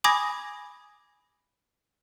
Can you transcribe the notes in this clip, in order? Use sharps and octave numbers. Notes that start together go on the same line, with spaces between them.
G#5 B5 D6 D#6 G#6 A#6